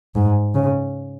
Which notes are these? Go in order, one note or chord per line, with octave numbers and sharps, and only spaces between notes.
G#2
C#3